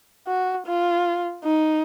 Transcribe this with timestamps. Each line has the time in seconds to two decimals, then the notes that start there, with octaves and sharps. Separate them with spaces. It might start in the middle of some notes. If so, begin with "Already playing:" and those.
0.27 F#4
0.66 F4
1.44 D#4